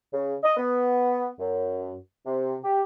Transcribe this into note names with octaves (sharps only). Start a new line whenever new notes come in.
C#3
D#5
B3
F#2
C3
G4